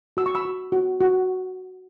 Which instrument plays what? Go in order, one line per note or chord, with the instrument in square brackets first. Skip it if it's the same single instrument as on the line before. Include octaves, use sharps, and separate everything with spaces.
[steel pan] F#4 E6
C#6
B5 E6
F#4
F#4
F#4